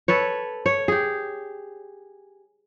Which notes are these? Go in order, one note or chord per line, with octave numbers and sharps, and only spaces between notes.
A4 B4 C#5
C#5
G4 G#4